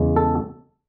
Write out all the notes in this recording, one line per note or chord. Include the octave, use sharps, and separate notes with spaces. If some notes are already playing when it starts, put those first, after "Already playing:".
Already playing: E2 C#3 G#3
A4